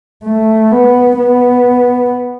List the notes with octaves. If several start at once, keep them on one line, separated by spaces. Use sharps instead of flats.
A3
B3
B3